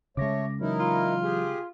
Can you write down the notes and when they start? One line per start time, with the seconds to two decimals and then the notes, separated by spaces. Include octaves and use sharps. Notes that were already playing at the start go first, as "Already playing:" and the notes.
0.17 C#3 G#3 A3 C#5 D6 A#6
0.61 E3 F#3 D#4 E4 A#4
0.79 F4
1.23 G4 G#4